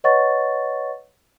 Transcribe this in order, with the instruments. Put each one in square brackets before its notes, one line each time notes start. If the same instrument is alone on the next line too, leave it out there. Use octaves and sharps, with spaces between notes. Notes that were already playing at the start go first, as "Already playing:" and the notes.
[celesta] B4 C#5 D#5 F#5 C#6 A6